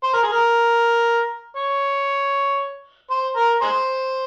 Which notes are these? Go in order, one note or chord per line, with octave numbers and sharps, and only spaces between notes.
C5
A#4
G#4
A#4
C#5
C5
A#4
G#4 C5